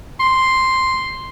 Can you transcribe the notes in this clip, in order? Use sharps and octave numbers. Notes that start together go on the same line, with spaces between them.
C6